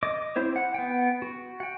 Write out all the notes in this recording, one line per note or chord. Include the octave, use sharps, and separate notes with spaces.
D#5 D6
C4 E4 C5 C#5
F#5
B3 G5
F#4
F#5 G5